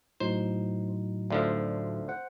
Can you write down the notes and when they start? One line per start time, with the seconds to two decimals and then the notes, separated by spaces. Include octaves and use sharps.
0.20 A2 F#3 D#4 C5
1.30 D2 D3 F3
2.08 C5 F#5